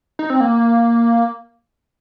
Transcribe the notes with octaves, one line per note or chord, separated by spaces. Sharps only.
D#4
C4
A#3